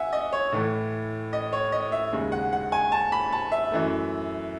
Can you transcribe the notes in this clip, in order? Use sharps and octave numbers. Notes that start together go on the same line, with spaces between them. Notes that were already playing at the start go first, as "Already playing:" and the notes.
Already playing: E5 F#5 G#5
D#5
C#5
A2 E3 A3
D#5
C#5
D#5
E5
D#2 C#3 G#3
F#5
F#5
G#5
A5
B5
A5
E5
F#2 E3 A3